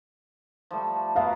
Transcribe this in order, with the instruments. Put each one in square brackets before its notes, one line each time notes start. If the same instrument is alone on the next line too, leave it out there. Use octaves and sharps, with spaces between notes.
[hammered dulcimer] F3 G3 A3
[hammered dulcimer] B3 F#4 A#4 [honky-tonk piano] E5 F5